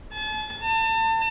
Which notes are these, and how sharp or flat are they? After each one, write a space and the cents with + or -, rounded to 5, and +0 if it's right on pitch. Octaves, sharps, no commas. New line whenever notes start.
A5 -40
A5 +35